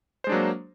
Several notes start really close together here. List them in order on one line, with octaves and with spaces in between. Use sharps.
C5 G#3 D4 F#3 A#3